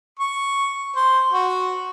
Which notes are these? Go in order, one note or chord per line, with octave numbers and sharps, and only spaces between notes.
C#6
C5
F#4